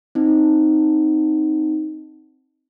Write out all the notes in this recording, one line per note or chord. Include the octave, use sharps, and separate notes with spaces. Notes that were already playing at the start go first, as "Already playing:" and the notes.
C4 D#4